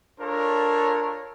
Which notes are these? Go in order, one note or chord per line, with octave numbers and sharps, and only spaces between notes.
D4 F4 A4 A#4 C#5